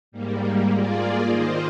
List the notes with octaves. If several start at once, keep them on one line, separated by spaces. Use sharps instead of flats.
G#2 G3 A#3
A#3 F4 G#4 D5
D#3 A#3 F4 C5 D#5